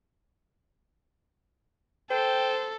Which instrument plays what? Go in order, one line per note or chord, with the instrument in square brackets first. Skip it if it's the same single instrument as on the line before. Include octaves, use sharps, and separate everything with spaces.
[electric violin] A4 [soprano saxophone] C5 [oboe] G5